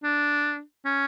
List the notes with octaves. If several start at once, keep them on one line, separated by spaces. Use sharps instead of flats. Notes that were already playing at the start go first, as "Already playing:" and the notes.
D4
C#4